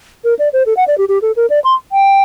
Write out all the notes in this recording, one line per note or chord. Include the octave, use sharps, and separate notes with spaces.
A#4
D5
C5
A4
F#5
D5
G4
G4
A4
A#4
D5
C6
G5